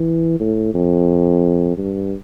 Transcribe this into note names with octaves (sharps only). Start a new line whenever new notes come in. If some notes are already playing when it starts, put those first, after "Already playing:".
Already playing: E3
A2
F2
G2